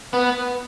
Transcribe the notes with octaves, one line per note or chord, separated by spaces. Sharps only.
B3